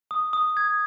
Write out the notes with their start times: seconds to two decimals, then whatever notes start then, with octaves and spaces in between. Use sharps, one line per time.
0.11 D#6
0.33 D#6
0.57 G#6